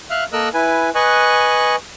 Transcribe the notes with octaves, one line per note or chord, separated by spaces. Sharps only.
E5 F5 F6 F#6
A#3 A4 A#4 D#5 E6 F#6
E4 B4 G#5
B4 D#5 G#5 C#6 F#6